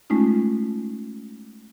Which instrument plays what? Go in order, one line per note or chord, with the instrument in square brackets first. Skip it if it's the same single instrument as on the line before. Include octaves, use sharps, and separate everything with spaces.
[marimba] G#3 A3 C#4 D#4 F4